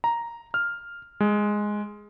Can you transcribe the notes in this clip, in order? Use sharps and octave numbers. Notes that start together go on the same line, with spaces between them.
A#5
F6
G#3